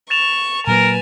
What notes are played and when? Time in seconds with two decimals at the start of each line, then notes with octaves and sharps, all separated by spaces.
0.10 C#6 A6 E7 F7
0.67 A#2 F#3 A#3 A#4 B4 G#5